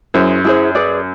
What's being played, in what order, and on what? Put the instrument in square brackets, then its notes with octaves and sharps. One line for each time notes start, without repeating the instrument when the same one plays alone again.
[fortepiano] F#2 [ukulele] E4 G#4 C5
[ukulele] E4 G#4 C5
G#4 B4 D5